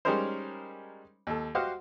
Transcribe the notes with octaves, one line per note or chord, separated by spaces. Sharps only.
G3 G#3 C#4 D#4 A#4 C5
D#2 A4
F#4 G4 C5 D#5 F5 F#5